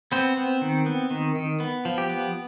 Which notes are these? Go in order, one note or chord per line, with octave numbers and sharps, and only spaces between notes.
B3 C4 C5
B3
D#3
B3
D#3
D#3
B3
F3
G4
B3